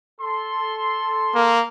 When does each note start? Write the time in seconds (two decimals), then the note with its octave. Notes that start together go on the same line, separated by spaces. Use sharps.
0.21 A4 C6
1.35 A#3